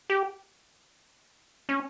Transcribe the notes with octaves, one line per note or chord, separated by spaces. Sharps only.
G4
C#4